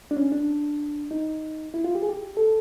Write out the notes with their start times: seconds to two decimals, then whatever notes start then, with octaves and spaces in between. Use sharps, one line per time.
0.11 D4
0.17 C#4
0.32 D4
1.11 D#4
1.74 E4
1.84 F4
1.95 G4
2.02 G#4
2.09 G4
2.37 A4